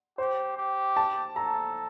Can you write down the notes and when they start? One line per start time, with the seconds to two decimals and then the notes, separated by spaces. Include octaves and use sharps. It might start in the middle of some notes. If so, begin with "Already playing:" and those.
0.18 G4 C5
0.57 G4
0.97 A5
1.36 A4 A#5